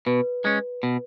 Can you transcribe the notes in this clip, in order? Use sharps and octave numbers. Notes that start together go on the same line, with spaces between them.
B2 B4
G#3 C#4
B2